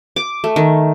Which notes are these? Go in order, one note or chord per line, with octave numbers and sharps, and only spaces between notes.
D6
A3
D#3